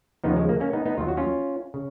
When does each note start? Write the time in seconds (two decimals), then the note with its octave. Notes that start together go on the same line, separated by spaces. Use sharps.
0.24 D#2 C#3 F3 B3 D#4
0.36 G#3
0.49 A#3
0.60 A#3 C#4
0.73 B3 D#4
0.86 B3 D#4
0.98 D#2 D#3 F#3 F4
1.08 F#4
1.17 C#4 F4
1.74 C#3